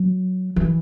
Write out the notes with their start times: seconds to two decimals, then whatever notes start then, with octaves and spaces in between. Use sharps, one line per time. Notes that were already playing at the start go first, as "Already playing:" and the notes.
Already playing: F#3
0.56 E3